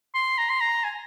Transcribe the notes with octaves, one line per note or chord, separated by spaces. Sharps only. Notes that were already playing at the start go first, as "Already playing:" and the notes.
C6
A#5
C6
A#5
G#5